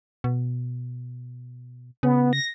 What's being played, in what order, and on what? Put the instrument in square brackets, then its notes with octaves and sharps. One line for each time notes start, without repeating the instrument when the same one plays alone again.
[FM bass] B2
[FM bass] C#3 [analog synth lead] B3
[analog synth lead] A#6